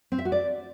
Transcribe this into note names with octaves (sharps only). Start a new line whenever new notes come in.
C4
E5
F#4
D5